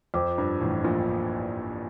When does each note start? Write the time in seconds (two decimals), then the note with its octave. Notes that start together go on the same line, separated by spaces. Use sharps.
0.14 F2 F4 C5 G5 D6
0.38 G2
0.61 A1 A2
0.84 A#1 A#2